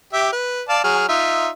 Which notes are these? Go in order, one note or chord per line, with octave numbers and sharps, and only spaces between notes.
G4 E5
B4
D5 F5 A5
F#3 G#4 F6
D#4 F4 E5